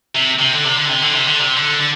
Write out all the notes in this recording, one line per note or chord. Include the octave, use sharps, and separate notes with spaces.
C3
C3
D3
C3
D3
C3
D3
C3
D3
C3
D3
D3